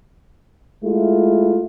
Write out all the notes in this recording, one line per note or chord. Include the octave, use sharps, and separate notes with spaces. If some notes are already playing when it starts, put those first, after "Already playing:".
G#3 A3 E4 F4